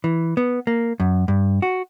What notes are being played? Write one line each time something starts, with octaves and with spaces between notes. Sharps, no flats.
E3
B3
A#3
F#2
G2
F#4